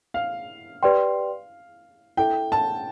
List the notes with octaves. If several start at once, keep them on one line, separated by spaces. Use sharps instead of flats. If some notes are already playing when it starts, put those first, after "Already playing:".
F5
G4 B4 D5 G5 C6
E4 A4 E5 G5
A5